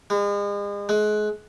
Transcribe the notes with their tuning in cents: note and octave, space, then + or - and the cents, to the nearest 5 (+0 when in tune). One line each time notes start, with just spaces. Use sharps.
G#3 -40
G#3 +30